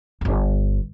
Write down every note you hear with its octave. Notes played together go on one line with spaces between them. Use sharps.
D1 G1